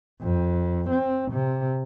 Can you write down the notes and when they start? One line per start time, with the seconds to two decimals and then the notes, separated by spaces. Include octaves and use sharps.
0.22 F2
0.89 C4
1.32 C3